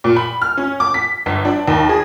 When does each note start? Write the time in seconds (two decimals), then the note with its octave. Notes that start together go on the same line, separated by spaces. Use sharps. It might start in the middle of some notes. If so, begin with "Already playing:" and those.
0.04 A#2
0.16 B5
0.42 F6
0.57 C#4
0.80 D6
0.94 B6
1.26 G1
1.45 D4
1.68 D#2
1.89 G#4